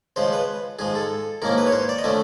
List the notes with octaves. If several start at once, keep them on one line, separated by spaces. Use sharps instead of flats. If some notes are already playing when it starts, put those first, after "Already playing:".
C#3 F3 G#3 C5
B4
G#2 F3 G#3 G#4
A4
G#2 F3 A#3 C#4 E4 A#4
B4
C#5
C5
D5
D#5
D3 F3 A3 C#4 E5